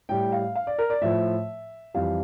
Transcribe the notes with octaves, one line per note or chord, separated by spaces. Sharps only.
A2 G3 G5
F5
F5
D5
A#4
D5
A2 F3 E5
F2 E3 G3 F5